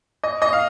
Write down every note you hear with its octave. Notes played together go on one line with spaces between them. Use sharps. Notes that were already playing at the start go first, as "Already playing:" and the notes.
D#5
D#5
F5